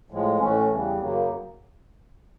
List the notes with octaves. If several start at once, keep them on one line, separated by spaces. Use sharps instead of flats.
A2 F3 G#3
A2 E3 A3 C#4
E2 C#3 E3 G3
F#2 C#3 F#3 A#3